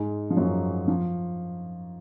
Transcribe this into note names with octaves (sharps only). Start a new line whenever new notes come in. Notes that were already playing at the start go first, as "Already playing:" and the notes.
Already playing: G#2 G#3
F3
F#2 F#3
F3